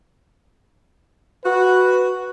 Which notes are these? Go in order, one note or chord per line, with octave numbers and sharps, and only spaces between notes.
F#4 B4